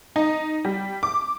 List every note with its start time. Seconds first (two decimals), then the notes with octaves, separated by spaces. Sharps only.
0.16 D#4
0.65 G3
1.03 D6